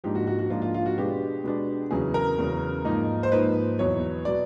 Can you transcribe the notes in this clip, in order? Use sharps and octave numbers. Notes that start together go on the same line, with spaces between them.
G#2 F3 A#3 D4 G4
F#4
F#4
F#4
G#2 F3 A#3 D4 F4
F4
F4
F#4
B2 G#3 B3 D4 G4
B2 G#3 B3 D4
E2 C#3 F#3 G#4
A#4
E2 C#3 F#3
G#2 F3 A#3 D#4
C5
G#2 F3 A#3 D#4 B4
E2 B2 F#3 B3 C#5
B2 F#3 B3 D5